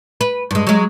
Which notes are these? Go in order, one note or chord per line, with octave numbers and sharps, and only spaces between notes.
B4
G2 G#3
F#3 G#3